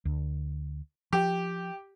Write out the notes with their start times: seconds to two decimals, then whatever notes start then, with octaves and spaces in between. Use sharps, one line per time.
0.05 D2
1.13 F3 G4